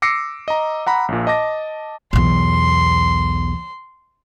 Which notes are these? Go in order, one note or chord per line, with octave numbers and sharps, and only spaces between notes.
D6 E6 A#6 C7 C#7
D#5 A#5
F#5 A#5 B5
A#1 A#2
D#5 A5 D6 A#6
B1 E2 C6